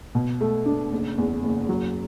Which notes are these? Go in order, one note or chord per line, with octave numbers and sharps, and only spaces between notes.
B2
A3
D4
F#1
E2
F#1
F#3